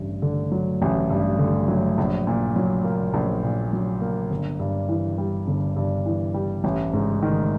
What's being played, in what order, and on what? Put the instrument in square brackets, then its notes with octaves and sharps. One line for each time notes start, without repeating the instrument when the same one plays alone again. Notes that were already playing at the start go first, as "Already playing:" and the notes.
Already playing: [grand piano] A1 G2
D3
F#3
A1
G2
D3
F#3
A#1
A#2
F#3
A#3
A#1
A#2
F#3
A#3
G1
G2
E3
G3
G1
G2
E3
G3
A1
G#2
D#3